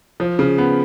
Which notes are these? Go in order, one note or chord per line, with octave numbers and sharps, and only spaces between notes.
F3
C#3
B3